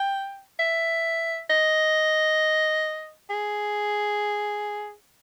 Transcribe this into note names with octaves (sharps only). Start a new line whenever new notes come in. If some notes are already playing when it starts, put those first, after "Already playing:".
Already playing: G5
E5
D#5
G#4